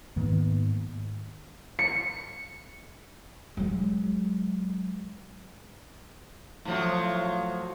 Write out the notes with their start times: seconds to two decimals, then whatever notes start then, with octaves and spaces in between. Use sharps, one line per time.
0.16 G#2 D#3 A#3 B3
1.79 C#7
3.57 F#3 G#3
6.65 A2 F3 F#3